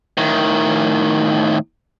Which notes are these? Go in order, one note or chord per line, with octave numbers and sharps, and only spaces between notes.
A2 D#3